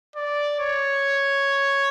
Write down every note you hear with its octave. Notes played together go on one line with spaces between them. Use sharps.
D5
C#5